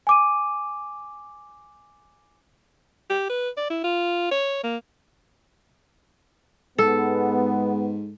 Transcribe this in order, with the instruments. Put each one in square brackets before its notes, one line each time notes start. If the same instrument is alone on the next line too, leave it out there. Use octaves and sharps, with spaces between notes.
[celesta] G#5 D6 D#7
[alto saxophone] G4
B4
D5
E4
F4
C#5
A#3
[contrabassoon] G#2 [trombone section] G#3 B3 [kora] A4